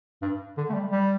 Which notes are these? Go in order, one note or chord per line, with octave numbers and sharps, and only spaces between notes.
G2
D3
A3
G3
G3